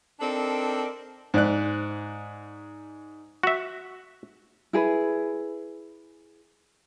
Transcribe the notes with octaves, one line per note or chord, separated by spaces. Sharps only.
C4 D4 D#4 A4 A#4 D5
G#2 D5 F#6
F#4 E5
E4 G#4 B4